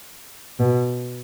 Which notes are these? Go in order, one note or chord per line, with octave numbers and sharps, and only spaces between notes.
B2